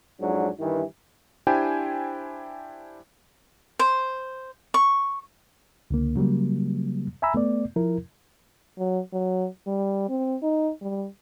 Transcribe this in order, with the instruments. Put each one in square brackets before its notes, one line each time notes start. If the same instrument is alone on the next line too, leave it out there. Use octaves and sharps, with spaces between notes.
[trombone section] F2 G#2 F#3 D4
G2 D#3 E3
[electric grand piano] D4 E4 G4 C5 G5 G#5
[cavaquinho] C5
C#6
[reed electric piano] C#2 D3 A#3
C#3 F#3 G3 A#3
E5 G#5 A#5 B5 E6
A3 B3 D5
F3 E4 A#4
[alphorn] F#3
F#3
G3
C4
D#4
G3